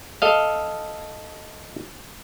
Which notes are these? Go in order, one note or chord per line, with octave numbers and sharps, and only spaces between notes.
A4 D#5 F5